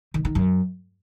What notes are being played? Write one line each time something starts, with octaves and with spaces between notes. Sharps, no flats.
D#3
D#3
F#2